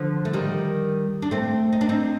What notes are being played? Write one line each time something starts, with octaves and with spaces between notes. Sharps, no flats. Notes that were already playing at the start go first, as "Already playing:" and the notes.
Already playing: D3 F3
A3
D#3 G3
D4
A3 C4
D#4
D4
C4 D#4